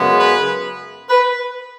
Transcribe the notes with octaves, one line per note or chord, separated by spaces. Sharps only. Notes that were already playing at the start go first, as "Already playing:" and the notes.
Already playing: F#2 C#3 G#3 B3
B4
B4